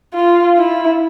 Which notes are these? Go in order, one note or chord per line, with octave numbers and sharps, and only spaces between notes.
F4
E4